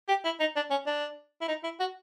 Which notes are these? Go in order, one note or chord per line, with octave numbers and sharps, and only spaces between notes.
G4
E4
D#4
D4
C#4
D4
E4
D#4
E4
F#4